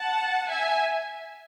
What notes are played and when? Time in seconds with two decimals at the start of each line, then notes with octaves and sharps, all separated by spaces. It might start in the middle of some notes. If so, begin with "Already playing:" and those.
Already playing: F#5 A5
0.49 E5 G#5